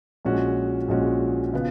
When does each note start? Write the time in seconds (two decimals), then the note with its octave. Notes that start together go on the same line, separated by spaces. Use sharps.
0.25 A#1 A#2 G#3 C#4 F#4
0.88 A#1 A#2 G#3 C#4 F#4
1.53 C#3 F3 B3